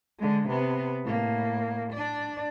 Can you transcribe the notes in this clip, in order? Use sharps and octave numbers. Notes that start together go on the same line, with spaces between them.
D3 G#3
C3 B3
A2 A#3
D4 D5